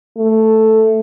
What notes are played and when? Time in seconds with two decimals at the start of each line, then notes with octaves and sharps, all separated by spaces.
0.18 A3